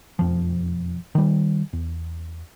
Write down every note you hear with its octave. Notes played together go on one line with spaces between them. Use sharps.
E1 F2 F3
D#3 G3
E2